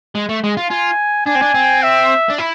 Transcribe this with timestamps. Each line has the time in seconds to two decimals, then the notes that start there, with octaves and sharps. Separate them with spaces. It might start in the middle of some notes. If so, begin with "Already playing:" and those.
0.15 G#3
0.29 A3
0.44 G#3
0.57 F4
0.71 F4 G#5
1.26 D4 G#5
1.35 C4
1.42 D4
1.55 C4
1.83 E5
2.30 D4
2.39 E4